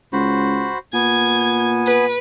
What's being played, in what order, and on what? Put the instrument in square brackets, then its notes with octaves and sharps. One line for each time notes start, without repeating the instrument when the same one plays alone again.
[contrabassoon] C#2 [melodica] F#4 C5 B5
[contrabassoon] A#2 [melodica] B3 G#5 [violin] G#6
[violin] B4